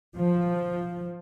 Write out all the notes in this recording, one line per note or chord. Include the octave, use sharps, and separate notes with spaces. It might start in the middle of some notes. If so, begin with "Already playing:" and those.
F3